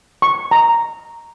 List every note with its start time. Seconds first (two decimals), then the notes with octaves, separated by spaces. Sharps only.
0.22 C#6
0.51 A#5